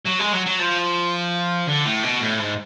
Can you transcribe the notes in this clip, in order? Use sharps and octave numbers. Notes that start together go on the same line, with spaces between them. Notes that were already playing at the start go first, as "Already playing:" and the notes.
F#3
G#3
F#3
F#3
F3
D3
A2
B2
A2
G#2